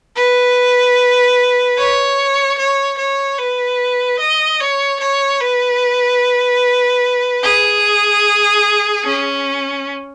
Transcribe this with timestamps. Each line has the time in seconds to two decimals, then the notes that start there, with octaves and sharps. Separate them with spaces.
0.16 B4
1.77 C#5
2.58 C#5
2.98 C#5
3.38 B4
4.19 D#5
4.60 C#5
5.00 C#5
5.40 B4
7.43 G#4
9.05 C#4